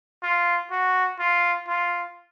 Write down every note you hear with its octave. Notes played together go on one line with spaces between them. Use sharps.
F4
F#4
F4
F4